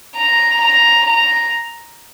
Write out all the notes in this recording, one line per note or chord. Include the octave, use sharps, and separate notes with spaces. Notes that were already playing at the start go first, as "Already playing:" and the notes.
A#5
A#5
A#5